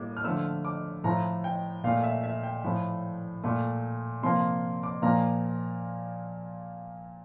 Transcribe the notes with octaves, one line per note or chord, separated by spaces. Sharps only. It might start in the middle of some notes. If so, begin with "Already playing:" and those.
Already playing: A2 G3 A#3 D6
F6
D3 F3 A3 E6
D6
A2 F3 A3 A#5
G5
A#2 A3 F5
E5
E5
G5
A2 F3 A3
A#2 A3
C3 F3 A#3 C6
D6
A#2 F3 A#3 A#5